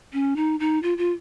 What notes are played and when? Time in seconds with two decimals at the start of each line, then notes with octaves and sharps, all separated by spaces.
0.13 C#4
0.36 D#4
0.60 D#4
0.83 F4
0.98 F4